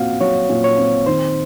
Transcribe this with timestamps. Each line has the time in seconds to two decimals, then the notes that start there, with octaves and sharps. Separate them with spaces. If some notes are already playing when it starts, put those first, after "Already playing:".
Already playing: A#2 C4 F#4 F5 F#5
0.21 F#3 C#5
0.49 A#2
0.64 C#5
0.78 C4
1.06 D#3 C5